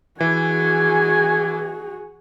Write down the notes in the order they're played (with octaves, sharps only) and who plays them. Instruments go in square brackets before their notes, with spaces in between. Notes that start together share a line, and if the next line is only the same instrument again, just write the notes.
[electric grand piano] E3 [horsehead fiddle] F#4 G#4 [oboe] G#5